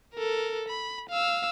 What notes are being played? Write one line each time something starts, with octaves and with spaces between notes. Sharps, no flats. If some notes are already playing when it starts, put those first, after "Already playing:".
A4 A#4
B5
F5 E6